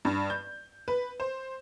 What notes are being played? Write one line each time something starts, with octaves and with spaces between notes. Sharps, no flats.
G2
G6
B4
C5